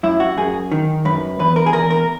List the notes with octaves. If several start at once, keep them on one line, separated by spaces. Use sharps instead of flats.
F#2 E4
F#4
F#2 G#4
D#3
F#2 B4
E2 B4
A#4
G#4
E2 A#4
A#4